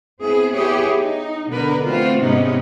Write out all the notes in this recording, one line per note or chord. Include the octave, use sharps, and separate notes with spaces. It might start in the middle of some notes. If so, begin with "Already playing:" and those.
B3 C4 E4 G#4
B3 E4 G4 G#4 C#5
D#4
B2 D3 A#4 B4
E3 A3 C4 F4 F#4 C5
G#2 C3 G#3 B3 C#4 D#4